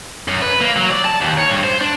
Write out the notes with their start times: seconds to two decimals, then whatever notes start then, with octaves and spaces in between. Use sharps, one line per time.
0.28 F#2
0.42 B4
0.61 A#3
0.76 F#3
0.91 D5
1.05 A5
1.21 D#2
1.38 C#5
1.49 G2
1.63 C5
1.81 D4